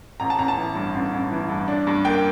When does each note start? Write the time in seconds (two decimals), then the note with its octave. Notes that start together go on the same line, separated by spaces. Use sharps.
0.20 A1 A#5
0.30 A5
0.39 A1 A#5
0.48 A5
0.58 E3
0.75 G2
0.95 A1
1.13 A1
1.31 E3
1.49 G2
1.68 D4
1.87 G2
2.05 A#3 G5